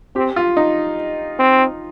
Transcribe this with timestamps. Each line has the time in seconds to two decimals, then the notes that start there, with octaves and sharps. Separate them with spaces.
0.15 C4 G4
0.36 F4
0.57 D#4
1.39 C4